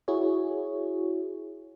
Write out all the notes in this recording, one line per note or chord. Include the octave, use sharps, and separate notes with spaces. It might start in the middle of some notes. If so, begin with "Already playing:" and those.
E4 F#4 G#4 C#5